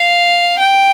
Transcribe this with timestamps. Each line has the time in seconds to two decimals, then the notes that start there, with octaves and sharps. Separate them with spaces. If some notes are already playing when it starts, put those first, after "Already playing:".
Already playing: F5
0.60 G5